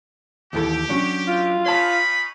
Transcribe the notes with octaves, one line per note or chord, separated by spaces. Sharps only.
D#2 E3 G4 A4
F#3 C#4 D4
F4
C#4 D#4 C#5 A5 B5